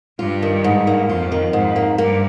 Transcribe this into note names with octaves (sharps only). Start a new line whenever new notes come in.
G2 F4
D#3
G#2
A#3
F2 F4
D#3
F2 G#2
A#3
G2 A#3